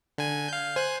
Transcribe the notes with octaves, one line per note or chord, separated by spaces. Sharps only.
D3 G#5
F5 G6
C5 G#5 F#6